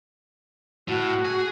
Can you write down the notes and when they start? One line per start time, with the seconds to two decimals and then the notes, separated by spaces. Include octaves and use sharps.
0.88 A2 F#4
1.25 G#4